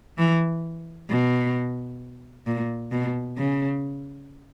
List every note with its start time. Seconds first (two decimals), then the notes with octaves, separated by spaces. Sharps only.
0.18 E3
1.10 B2
2.47 A#2
2.92 B2
3.38 C#3